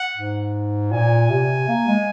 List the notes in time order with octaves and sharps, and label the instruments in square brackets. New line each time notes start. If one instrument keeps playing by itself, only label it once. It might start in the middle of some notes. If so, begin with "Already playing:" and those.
Already playing: [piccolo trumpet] F#5
[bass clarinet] G#2
[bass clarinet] A#2 [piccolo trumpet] G#5
[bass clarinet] C3
A#3
G#3